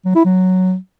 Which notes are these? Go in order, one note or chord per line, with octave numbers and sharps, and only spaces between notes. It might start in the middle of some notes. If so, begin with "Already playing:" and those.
F#3
E4
F#3